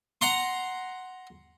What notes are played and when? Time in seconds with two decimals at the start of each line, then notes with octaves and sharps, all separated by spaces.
0.21 F#5 A#5 C6